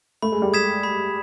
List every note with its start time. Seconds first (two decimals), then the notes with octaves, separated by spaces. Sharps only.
0.22 A3 B5
0.32 G#3
0.42 G3
0.51 G#3 D#6 G#6 B6 E7
0.83 B5